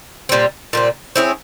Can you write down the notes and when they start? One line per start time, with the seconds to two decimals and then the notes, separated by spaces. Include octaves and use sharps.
0.29 A#2 G3 C4
0.73 A#2 G3 C4
1.16 C4 E4 G#4 C#5